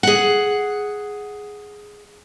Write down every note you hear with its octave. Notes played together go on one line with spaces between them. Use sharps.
G#4 F#5